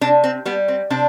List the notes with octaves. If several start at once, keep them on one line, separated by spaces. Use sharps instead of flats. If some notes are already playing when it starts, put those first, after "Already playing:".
C3 D4
C4
G3 B3
C4
C3 D4